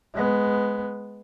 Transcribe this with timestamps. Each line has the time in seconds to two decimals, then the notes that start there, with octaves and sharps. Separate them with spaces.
0.14 G#3 B3